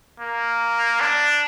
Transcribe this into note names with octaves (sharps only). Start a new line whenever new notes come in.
A#3
D4